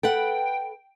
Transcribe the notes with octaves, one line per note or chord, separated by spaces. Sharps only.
A4 B4 F#5 G5